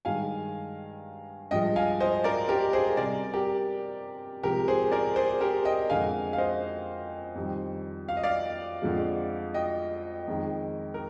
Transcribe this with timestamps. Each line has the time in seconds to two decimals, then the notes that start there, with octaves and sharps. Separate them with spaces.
0.05 G2 D#3 G#3 F5 G#5
1.51 G2 F3 G#3 D#5 G5
1.76 F5 G#5
2.00 C5 D#5
2.24 A#4 D5
2.49 G4 A#4
2.73 G#4 C5
2.97 C3 G3 A#4 D5
3.33 G4 A#4
4.43 C3 F3 G#3 G4 A#4
4.68 G#4 C5
4.92 A#4 D5
5.16 G#4 C5
5.41 G4 A#4
5.65 D#5 G5
5.90 F2 D3 G#3 F5 G#5
6.33 F5
6.38 C5 D#5
7.35 F2 D#3 G3
8.08 F5
8.17 D#5
8.24 D5 F5
8.82 F2 D3 F3 G#3
9.54 D#5 G5
10.28 F2 D#3 G#3
10.94 A#4